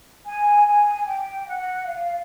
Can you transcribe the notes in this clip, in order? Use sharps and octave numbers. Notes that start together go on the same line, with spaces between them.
G#5
G#5
G5
F#5
F5